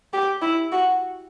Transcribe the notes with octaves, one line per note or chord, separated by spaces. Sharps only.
G4
E4
F#4